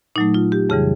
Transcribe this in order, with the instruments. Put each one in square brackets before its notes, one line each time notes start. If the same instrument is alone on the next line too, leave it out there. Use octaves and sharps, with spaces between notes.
[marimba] A#2 F#3 A3 D#4
F4
G4
F2 C#3 E3 G3 G#4